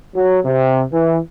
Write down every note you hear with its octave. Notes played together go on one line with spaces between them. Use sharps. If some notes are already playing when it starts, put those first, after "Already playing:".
F#3
C3
E3